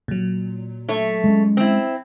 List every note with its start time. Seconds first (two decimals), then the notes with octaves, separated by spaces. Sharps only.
0.08 A#2 F#3
0.89 A3 C#5
1.24 G#3 C#4
1.57 C4 E4